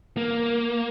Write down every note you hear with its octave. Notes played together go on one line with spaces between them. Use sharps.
A#3